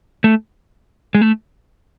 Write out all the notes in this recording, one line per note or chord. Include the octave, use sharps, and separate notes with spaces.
A3
G#3
A3